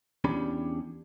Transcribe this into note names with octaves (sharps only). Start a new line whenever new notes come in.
E2 C#4 D4 G4 B5